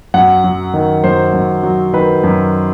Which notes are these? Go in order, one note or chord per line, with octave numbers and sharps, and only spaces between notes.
F#2 F#5
F#3
D#3
F#2 C5
F#2
F#3
D#3 B4
F#2